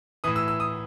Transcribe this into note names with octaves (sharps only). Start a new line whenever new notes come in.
A2 E3 D#6
E6
E6
D#6